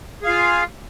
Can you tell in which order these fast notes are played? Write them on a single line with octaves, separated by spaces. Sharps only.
G#4 F5 F4